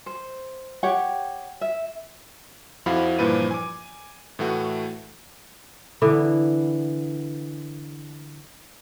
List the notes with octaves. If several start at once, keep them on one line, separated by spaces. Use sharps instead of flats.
C5
G4 C#5 F#5 G5
E5
F2 F3 E4 F#4 F5 B5
G2 A#2 E3 F3 B4 D#7
G#5 D6
A2 E3 A3 F#4
D3 E3 B3